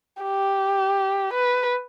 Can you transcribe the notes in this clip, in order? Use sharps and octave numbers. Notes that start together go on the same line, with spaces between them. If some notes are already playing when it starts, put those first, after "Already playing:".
G4
B4